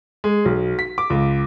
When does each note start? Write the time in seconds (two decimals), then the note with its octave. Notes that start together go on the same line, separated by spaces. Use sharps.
0.24 G#3
0.45 B1
0.79 B6
0.98 D6
1.10 C#2